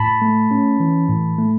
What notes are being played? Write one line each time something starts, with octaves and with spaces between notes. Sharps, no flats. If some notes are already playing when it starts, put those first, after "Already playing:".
Already playing: A2 A5 B5
A3
C#4
E3
A2
A3